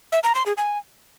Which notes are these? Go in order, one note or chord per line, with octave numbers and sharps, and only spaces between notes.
E5
A#5
C6
G#4
G#5